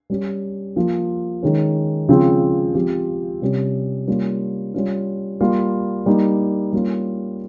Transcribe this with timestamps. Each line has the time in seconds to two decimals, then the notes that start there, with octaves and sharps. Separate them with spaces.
0.10 G3 C#4 G4
0.76 F3 A#3 F4
1.43 D#3 G#3 C#4
2.09 C#3 F3 G#3 C4 F4
2.74 F3 C4 G4
3.41 C3 G3 C#4 G4
4.07 G3 A#3 C#4 F4
4.74 G3 C#4 F4
5.41 G3 A#3 F4
6.06 G3 A#3 D#4
6.73 G3 A#3 C#4 F4